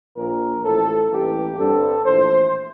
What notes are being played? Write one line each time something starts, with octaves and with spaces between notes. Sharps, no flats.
A#1 A#2 F3 A#3 A#4
A1 A2 F3 A4
A1 G2 E3 A#3 G4
G2 D3 G3 C4 A4
A#1 A2 E3 C5